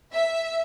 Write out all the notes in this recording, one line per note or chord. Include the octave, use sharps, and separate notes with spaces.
E5